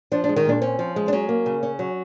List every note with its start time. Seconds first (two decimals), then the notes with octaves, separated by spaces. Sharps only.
0.12 F3 D4
0.24 D4
0.29 G#3
0.36 D#3 D#4
0.45 A#2 D4
0.61 C4 C#4
0.79 F3
0.96 G#3
1.08 D4
1.12 F#3 C#4
1.29 A#3
1.46 C#3
1.63 C#4
1.79 F#3